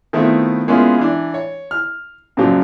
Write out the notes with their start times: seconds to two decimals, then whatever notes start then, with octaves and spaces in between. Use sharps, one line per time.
0.13 D#3 A3 B3 C4 E4 F4
0.68 G#3 A#3 B3 C#4 E4 F4
0.98 E3 D4
1.34 C#5
1.71 F6
2.37 F#2 A#2 C#3 F3 F#3